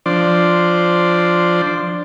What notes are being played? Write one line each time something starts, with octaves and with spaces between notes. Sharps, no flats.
F3 D4 C5 D5